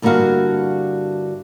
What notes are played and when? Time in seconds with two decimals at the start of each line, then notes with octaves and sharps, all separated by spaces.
0.02 G2 D3 A#3 E4 F#4 F5